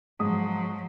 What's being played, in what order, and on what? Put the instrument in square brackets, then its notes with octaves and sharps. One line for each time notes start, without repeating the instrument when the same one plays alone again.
[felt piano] G#2 D#6 [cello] F3 F#3